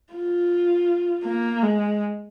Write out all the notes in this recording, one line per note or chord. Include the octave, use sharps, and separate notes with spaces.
F4
A#3
G#3